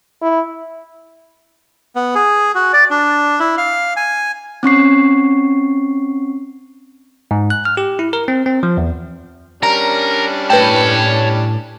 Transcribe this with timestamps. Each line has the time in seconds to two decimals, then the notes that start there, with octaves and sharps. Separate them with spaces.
0.22 E4
1.96 B3
2.15 G#4
2.55 F#4
2.73 D5
2.91 D4
3.40 E4
3.58 F5
3.97 G#5
4.63 C4 C#4 C#6 C7
7.31 G#2
7.50 F#6
7.65 F6
7.77 G4
7.99 E4
8.13 A#4
8.28 C4
8.46 C4
8.63 F3
8.77 E2
9.63 G3 C#4 D4 A#4 A#5
10.50 A2 B4 C#5 G5 A5